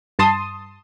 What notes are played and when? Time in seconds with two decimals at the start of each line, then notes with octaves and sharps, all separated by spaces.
0.19 G2 A5 C6 D#6